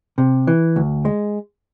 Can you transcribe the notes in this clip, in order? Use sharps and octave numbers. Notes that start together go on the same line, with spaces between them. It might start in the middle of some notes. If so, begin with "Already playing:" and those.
C3
E3
D2
G#3